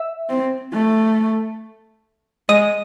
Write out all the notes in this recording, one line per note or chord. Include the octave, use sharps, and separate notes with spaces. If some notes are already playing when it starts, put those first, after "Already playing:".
Already playing: E5
C4
A3
G#3 D#5